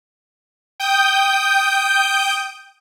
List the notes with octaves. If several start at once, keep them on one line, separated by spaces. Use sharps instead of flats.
G5 D#6 G6